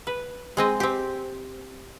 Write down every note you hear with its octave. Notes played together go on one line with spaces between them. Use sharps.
B4
G#3 C4 D#5
C4 G4